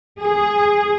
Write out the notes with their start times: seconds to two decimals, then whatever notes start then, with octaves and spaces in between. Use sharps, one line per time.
0.19 G#4